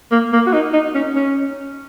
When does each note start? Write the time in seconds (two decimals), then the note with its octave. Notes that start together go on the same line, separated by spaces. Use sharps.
0.11 A#3
0.33 A#3
0.47 F#4
0.53 D#4
0.73 D#4
0.95 C#4
1.16 C#4